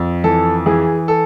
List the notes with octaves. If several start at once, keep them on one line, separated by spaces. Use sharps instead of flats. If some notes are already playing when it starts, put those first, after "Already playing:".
Already playing: F2
E3 A4
E3 G#4
A4